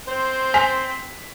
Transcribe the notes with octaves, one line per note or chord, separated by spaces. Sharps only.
C4 C5
G#5 B6